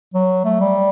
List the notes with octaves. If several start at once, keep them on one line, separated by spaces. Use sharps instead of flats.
F#3
A3
G3